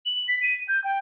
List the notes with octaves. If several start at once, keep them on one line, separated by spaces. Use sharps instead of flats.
F#7
B6
D#7
G6
G5